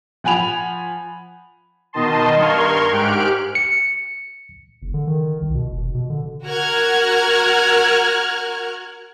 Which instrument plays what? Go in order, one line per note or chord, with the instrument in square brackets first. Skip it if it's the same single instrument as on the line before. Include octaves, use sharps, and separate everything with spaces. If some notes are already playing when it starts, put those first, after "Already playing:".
[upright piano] F3 F#5 G#5 B5 F7
[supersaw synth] B2 D#3 D#5 A5 C6
G2 A#4 C6 C#6 F6 G#6
G#2 G4 F6 F#6 D7
[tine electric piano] C#7
[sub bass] F#1
D3
D#3
C2
B2
F1
B2
D3
[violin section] F#4 A#4 F6 F#6 G#6